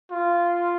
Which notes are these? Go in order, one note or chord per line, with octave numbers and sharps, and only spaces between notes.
F4